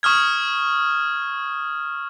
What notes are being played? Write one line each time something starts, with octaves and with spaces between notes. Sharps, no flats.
C#6 D#6 F6 G#6